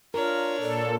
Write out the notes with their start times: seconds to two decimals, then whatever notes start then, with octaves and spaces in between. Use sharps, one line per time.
0.14 D4 F4 A#4 C#5
0.60 A#2 A4 D5